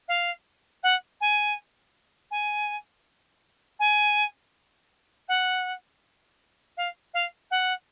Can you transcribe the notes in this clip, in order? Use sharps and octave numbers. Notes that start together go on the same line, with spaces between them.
F5
F#5
G#5
G#5
G#5
F#5
F5
F5
F#5